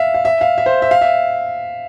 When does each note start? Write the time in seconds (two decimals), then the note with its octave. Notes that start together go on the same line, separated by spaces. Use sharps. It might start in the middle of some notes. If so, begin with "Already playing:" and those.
Already playing: E5 F5
0.14 F5
0.25 E5
0.41 F5
0.58 E5
0.66 C5
0.82 E5
0.91 F5
1.01 E5